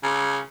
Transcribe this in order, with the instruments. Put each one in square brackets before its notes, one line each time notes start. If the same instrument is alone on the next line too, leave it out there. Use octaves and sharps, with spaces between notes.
[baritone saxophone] C#3